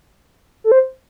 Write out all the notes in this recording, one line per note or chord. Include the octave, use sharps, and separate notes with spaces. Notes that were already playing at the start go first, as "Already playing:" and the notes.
A4
C5